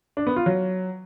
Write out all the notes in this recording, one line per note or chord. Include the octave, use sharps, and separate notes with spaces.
D4
B3
F4
F#3